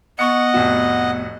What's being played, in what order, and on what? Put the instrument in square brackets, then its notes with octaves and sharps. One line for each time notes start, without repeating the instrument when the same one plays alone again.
[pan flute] B3 [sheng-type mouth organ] D#5 F#5 [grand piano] C#6 C#7
[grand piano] F1 A2 F#4